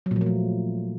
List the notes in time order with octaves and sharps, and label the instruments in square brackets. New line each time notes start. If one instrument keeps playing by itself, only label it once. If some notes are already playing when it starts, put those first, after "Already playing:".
[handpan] F#3
A#2
F3
A#3
A3